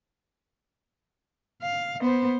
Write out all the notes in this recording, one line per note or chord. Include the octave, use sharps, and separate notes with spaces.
F5
B3 C5